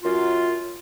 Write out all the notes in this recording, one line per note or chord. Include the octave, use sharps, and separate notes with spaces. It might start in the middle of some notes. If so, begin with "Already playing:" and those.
F#2 F4